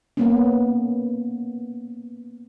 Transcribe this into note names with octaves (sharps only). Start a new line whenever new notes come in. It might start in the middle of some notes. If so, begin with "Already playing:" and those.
A#3 B3 C#4